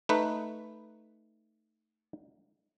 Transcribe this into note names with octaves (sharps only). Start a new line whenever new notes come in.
A3 D#4 B4